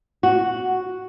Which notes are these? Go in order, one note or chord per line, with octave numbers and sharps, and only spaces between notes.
F#4